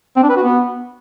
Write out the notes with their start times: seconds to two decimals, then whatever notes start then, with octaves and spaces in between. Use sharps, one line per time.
0.16 C4
0.23 D4
0.30 B4
0.36 F#4
0.43 B3